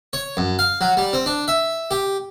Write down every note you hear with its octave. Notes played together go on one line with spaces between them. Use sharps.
C#5
F#2
F5
F#3
G3
C4
D4
E5
G4